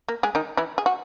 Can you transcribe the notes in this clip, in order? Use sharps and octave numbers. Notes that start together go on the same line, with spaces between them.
A#3
G#3 G#4
D#3 D#4
E3 E4
G#4
F#4